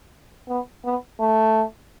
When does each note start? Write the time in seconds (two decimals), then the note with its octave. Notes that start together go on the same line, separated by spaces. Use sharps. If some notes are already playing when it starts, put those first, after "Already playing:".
0.48 B3
0.85 B3
1.20 A3